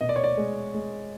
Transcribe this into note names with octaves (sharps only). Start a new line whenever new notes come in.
B2 D#5
D5
C#5
D5
G#3
G#3